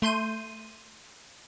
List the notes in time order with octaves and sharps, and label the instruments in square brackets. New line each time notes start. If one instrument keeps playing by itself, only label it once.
[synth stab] A3 C6 G6 D#7